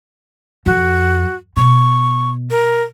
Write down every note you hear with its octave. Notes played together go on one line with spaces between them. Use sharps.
F2 F#4
B2 C#6
A#4